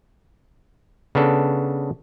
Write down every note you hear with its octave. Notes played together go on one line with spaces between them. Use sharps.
C#3 B3 D4 A4